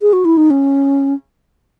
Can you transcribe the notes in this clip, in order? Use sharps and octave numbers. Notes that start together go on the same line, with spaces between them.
G#4
F#4
E4
D#4
C#4